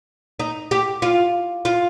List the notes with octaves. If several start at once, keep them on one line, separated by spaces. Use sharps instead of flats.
D#4
G4
F4
F4